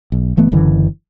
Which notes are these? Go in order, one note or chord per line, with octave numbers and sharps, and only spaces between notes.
B1
G1 E3 A3 B3
F#1 F#2 D3 E3